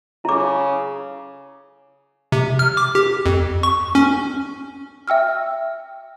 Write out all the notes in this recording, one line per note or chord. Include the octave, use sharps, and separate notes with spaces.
C#3 E4 D6
C3
F6
D6
G4
F2
C#6
C#4
E5 G5 E6 F6